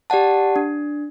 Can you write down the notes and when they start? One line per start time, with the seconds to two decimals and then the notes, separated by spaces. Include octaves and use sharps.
0.10 G4 D5 F#5 A5
0.56 D4